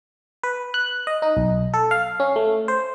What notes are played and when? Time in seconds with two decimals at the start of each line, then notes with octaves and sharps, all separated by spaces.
0.43 B4
0.74 F#6
1.07 D#5
1.22 D#4
1.37 B1
1.74 A4
1.91 F5
2.20 C#4
2.36 A3
2.68 C5